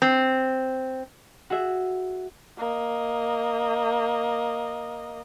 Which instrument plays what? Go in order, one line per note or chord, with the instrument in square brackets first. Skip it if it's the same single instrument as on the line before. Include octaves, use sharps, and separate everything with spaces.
[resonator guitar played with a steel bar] C4
[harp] F#4 G#4 E5
[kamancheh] A#3 D#5